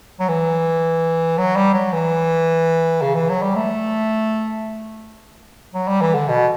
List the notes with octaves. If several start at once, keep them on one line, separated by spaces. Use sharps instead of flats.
F#3
E3
F#3
G3
F#3
E3
C#3
E3
F#3
G3
A3
F#3
G3
E3
D3
B2